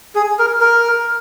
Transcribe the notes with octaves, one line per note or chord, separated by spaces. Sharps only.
G#4
A#4
A#4